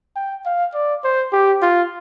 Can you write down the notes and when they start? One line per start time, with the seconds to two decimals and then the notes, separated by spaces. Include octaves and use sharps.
0.16 G5
0.46 F5
0.74 D5
1.04 C5
1.33 G4
1.62 F4